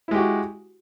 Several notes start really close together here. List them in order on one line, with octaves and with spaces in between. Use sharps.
E4 G#3 G4 F#4